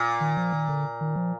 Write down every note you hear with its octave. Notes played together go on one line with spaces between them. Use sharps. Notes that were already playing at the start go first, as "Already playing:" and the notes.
Already playing: A#2
D#3
F3
D#3
D3
D#3
F3